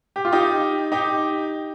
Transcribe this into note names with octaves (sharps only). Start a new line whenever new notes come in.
G4
F4
D#4 G4
D#4 G4